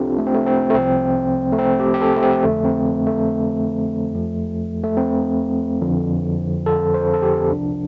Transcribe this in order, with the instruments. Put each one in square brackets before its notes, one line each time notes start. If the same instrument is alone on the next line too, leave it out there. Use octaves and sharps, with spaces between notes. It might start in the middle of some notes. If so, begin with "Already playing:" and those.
Already playing: [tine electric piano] C2 C3 F3 C4 D4 F4 G4 A4
A3
C4
A3
C4
A3
C2 C3 F3 C4
A3
C4
G4
G4
A4
A3
C4
F2 D3 F3 A3
C4
A3
F2 F3
A3
C4
F2 D3 F3
A4
C5
A4
G4
C2 C3 F3 D4